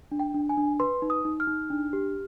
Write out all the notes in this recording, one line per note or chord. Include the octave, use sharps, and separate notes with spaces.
D4
G5
D4
G#5
D4
B4 C6
D#4
D#6
D#4
F6
D#4
D4
G4